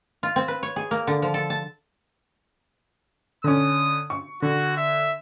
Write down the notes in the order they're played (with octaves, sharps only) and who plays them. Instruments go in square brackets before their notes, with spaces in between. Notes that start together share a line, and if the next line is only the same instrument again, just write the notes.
[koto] F4
C4
B4
C#5
G#4
A#3
D3
F3
A4
A5
[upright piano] D3 C#4 [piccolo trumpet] D#6
[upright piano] C#6
[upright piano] D3 [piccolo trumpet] F#4
[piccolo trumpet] E5